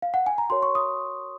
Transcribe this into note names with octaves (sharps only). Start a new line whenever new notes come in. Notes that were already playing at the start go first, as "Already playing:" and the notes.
F5
F#5
G#5
A#5
F#4 A#4 C#5 C6
C#6
D#6